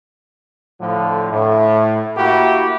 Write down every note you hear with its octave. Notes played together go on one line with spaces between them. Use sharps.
A2 D3 F3
A2
A#3 E4 F#4 G4